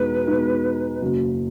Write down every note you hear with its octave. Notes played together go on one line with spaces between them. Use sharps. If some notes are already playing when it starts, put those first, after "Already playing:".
Already playing: E2 B2 G#3 D#4 B4
E2 B2 G#3 D#4
F#1 F#2 C#3 F#3